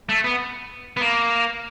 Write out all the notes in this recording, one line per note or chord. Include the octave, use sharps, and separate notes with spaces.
A3
B3
B3
A#3